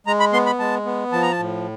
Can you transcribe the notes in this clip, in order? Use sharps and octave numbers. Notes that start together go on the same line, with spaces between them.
G#3 A#5
B5
B3 C6
B5
G#3 A5
B3
F3 A5
A#5
A5
A2